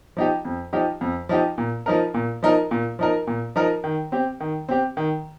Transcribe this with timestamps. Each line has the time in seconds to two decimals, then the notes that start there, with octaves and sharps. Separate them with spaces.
0.17 F3 D#4 G4
0.45 F2
0.73 F3 D#4 G4
1.01 F2
1.29 F3 D#4 G4
1.58 A#2
1.86 F3 D#4 A#4
2.14 A#2
2.43 F3 D#4 A#4
2.71 A#2
2.99 F3 D#4 A#4
3.27 A#2
3.56 F3 D#4 A#4
3.84 D#3
4.12 C4 G4
4.40 D#3
4.69 C4 G4
4.97 D#3